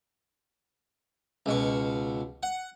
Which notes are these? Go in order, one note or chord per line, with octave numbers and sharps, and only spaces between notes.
C#2 B2 C#6
F#5